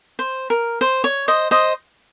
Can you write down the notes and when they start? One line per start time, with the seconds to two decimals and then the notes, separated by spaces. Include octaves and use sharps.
0.19 C5
0.50 A#4
0.81 C5
1.04 C#5
1.28 C5 D#5
1.51 C5 D#5